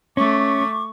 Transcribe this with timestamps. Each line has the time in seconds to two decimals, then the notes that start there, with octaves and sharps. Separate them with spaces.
0.17 A3 C#4 C#6 D6